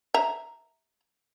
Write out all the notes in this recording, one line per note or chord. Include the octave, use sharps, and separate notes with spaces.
E5 A#5